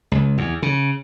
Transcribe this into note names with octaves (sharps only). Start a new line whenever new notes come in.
C#2
E2
C#3